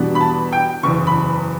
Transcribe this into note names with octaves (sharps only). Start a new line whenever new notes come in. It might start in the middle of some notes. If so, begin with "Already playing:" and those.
Already playing: E2 B2 G3 B3 D4
B5
A5
G5
F#1 E2 C#3 E3 C#6
B5